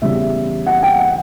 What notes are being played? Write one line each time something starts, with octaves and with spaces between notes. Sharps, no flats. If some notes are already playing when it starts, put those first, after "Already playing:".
E2 C#3 G3 E5
F#5
G5
F#5